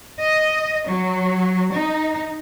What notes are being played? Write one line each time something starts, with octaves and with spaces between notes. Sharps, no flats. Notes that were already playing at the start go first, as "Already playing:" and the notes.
D#5
F#3
D#4